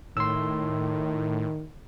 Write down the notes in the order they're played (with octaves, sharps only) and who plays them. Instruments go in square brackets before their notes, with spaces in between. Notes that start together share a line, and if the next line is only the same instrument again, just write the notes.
[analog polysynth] A2 [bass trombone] D#3 [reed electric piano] C6 E6